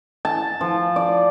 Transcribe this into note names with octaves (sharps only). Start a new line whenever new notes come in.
A5
F3
D5